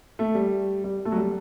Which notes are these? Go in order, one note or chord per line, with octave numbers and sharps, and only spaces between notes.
A3
G3
G3
A3
F#3
G3